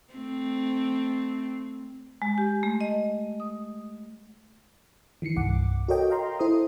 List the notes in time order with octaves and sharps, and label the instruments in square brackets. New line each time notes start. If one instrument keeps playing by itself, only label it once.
[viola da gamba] A3 C4
[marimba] G#3
G4
A3
D#5
D#6
[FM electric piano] D#3 E3 C7 C#7
C2 G2 F#5 D6
F#4 A4 A#4 C#5 D#5 G5
D#5 F5 G5 A#5 C6
E4 A4 C5 C6 D#6